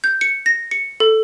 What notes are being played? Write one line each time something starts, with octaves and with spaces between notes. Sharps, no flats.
G6
C#7
A#6
C#7
A4